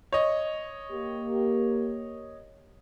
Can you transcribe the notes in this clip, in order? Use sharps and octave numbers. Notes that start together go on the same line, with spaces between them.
C#5 D#5
A#3 G4